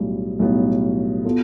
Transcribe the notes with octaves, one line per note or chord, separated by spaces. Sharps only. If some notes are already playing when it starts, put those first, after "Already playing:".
Already playing: B1 A2 G3 B3
B1 A2 G3 B3
B2 B3 F4 A4